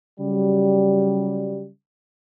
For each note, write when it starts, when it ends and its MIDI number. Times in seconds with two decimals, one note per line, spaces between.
0.20 1.69 49
0.20 1.69 54
0.20 1.69 55